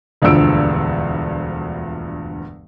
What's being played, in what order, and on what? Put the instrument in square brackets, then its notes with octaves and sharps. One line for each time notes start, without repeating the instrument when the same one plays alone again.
[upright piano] E1 D2 G2 F3 E6 D7